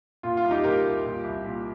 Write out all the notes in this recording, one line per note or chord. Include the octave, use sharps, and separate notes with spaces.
A#2 F4
F4
C2
D#4 G4
A#2 G4 A#4
C2
A#2
C2
A#2